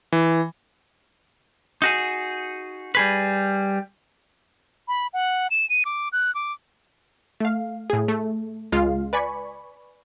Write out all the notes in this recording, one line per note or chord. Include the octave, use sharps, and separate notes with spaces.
E3
D#4 F#4 G#4
G3 G#4 B4
B5
F#5
E7
D#7
D6
F#6
D6
A3 F5
A2 G#4
A3
C#2 G#3 F4 F5
B4 D5 G#5 B5 C#6